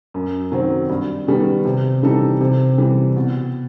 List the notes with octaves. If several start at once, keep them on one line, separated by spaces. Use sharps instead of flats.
F#2
D#3 F#3 C4
G2
D#3 G3 B3
C3
E3 G3 D#4 A4
C3
E3 G3
B2